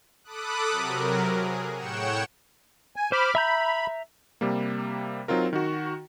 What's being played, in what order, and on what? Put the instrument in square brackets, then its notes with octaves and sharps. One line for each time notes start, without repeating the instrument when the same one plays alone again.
[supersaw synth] A4 B5 D6 D#6 F#6
C3 F#3 A#4
G#4
A2 C#5 F#5 G5 C#7 E7
[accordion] G#5
[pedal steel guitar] C5 [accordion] B5 D6 F6
[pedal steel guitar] E5 A#5 G6 [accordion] B5
[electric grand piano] C3 G3 A#3
F#3 C4 D#4 F4 A#4
D#3 F#4